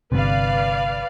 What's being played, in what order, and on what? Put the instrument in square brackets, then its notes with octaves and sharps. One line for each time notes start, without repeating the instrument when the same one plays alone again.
[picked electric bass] G1 G2 C3 [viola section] B4 D5 F5